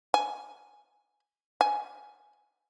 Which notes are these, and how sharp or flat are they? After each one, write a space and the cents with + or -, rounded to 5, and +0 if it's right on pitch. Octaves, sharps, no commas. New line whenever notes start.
G#5 -5
G#5 +5